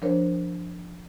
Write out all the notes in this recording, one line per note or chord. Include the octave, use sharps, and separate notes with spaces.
F3 D4 A#4 C5 C#5